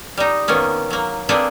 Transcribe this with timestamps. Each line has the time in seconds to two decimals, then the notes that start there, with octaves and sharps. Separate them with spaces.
0.17 G3 D#4
0.48 D#3 A#3 B3 C#4
0.90 F#3 A#3
1.29 A#3 C4 D4 G#4 A4 B4